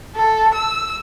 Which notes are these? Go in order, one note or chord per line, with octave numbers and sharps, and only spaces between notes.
A4
E6